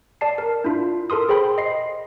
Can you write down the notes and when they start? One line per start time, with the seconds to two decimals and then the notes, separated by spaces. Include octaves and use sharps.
0.21 D5 A5 C7
0.38 A#4
0.64 D4 E4 F4
1.10 A4 A#4 C6 D#6
1.29 G#4 C5 G5 B5 C6
1.58 D#5 C7